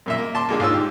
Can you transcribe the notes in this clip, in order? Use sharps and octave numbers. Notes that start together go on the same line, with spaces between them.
F#2 A#2 E5
A#3
A5 C6 D6
D3 G#3 A#3
G#2 F4 C#5 E6
G4